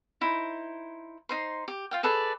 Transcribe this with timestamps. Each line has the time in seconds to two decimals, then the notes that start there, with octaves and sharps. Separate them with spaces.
0.21 D#4 E4 C5
1.29 D#4 C5 C6
1.68 G4
1.91 F4 F5 G5
2.03 G#4 A4 B4 D5